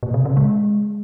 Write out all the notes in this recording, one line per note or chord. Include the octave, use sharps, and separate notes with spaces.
A#2
C3
C#3
G#3